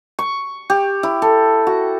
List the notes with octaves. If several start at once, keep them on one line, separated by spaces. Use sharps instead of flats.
C#6
G4
E4
A4
F#4